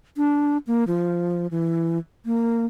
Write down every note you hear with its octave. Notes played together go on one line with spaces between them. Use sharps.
D4
A#3
F3
E3
A#3